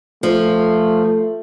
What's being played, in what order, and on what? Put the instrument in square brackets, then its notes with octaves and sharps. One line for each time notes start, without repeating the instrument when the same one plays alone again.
[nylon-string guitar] F3 [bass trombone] A3